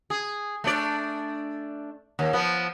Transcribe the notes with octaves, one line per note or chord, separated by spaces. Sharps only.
G#4
A3 D4 D5
D#2
F3 B3